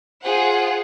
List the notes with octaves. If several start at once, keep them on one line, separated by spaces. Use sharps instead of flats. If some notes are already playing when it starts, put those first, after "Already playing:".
F4 G#4 C5 F#5